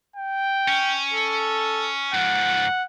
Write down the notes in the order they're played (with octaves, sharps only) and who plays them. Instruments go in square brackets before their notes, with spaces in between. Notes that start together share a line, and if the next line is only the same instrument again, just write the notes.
[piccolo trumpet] G5
[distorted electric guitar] C#4
[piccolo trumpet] A4
[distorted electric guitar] G#2 F3 [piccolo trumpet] F#5